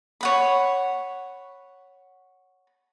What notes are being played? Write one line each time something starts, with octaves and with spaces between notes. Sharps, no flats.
C#5 F#5 B5